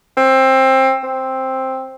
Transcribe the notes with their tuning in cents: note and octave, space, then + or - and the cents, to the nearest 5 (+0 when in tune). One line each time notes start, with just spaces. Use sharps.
C4 +20
C4 +5